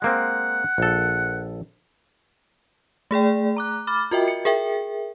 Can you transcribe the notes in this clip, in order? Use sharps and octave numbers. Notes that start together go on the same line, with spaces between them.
G#3 A#3 C4 F#5
A#1 A4
A3 G#4 D5 G5
A#5 D6 F#6
B5 D6 F6 A6
F4 F#4 A#4 D#5 E5 G5
C#7
G#4 A#4 E5 G5